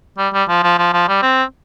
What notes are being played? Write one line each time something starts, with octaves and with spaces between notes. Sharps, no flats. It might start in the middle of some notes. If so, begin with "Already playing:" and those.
G3
G3
F3
F3
F3
F3
G3
C4